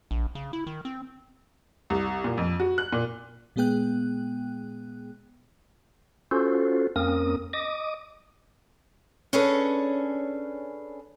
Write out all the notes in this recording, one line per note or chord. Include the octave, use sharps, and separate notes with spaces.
A#1
C#3
E4
D#3
C4
C2
A#2
F2
F#4
F#6
A#2
A#2 G#3 B3 G#4 G5 F#6
C#4 F4 F#4 A4 C5
F2 A#3 C4 C#4 A#4 D#6
D#5 D6 D#6
C#4 D4 G#4 A4 B4 C#5